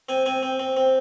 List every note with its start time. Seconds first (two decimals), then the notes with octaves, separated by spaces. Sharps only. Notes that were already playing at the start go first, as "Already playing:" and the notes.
0.09 C4 G#5
0.26 C4 G#5
0.43 C4
0.59 C4
0.77 C4